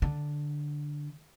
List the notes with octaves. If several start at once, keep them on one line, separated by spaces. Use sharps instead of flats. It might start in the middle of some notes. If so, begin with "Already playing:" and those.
D3